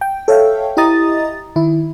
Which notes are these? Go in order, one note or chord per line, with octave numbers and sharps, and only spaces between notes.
G5
A4 C#5 E5 F5 G5
E4 G4 D#5 A#5 D#6 A6
D#3 E4